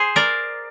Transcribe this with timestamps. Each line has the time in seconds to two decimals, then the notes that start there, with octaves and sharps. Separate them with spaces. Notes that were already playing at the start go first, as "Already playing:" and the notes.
Already playing: G#4 C5
0.16 A#4 D5